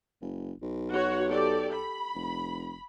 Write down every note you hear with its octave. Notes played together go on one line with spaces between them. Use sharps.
F#1
B1
F#4 C#5 F#5
G4 A4 D5
B5
F1